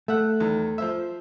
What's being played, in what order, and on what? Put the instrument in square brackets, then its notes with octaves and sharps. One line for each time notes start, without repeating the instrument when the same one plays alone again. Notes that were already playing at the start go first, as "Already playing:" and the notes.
[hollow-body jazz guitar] A3 [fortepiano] E5 F#5
[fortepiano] E2 D#3
F3 C5 E5